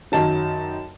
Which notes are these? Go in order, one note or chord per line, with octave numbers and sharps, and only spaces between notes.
F#2 D#3 F#3 A5